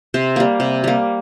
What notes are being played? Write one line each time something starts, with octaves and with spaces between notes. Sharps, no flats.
C3 C5
G3 A#3
C3
G3 A#3